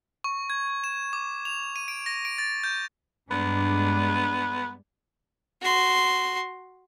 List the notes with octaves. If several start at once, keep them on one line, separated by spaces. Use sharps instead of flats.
C#6
G#6
E7
D6
F7
D#7
D7
A#6
D7
A6
G6
G2 G#3 B3 D4
F#4 C6